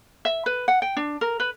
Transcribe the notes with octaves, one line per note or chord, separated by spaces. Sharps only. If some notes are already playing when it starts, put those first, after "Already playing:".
E5
B4
F#5
G5
D4
A#4
B4